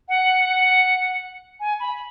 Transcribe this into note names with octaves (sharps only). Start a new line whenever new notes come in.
F#5
G#5
B5